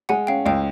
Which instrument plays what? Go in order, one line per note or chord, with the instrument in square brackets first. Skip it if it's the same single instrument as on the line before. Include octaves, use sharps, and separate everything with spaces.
[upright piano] G#3 [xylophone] F#5 G#5
[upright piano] C#4 [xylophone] F5 G5
[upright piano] C#2 [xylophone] F5 G5